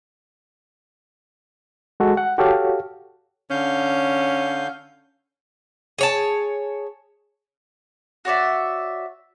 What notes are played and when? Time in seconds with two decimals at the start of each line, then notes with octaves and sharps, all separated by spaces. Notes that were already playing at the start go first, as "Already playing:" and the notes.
2.00 G#3 F#4 A4
2.17 F#5
2.38 F#4 G4 A4 C#5 F5
3.51 D3 C#4 F5 G6
5.98 G#4 C#5 A5
8.25 F#4 C#5 D5 E5